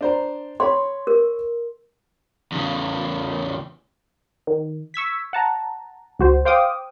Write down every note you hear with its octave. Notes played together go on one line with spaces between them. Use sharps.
D4 C5 A#5
C#5 B5 C6
A#4
E2 C#3
D#3
C#6 E6 G#6 B6
F#5 A5 A#5
C#2 F#4 C5
C5 F5 G5 D6 D#6